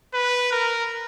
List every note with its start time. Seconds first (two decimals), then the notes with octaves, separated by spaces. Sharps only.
0.14 B4
0.52 A#4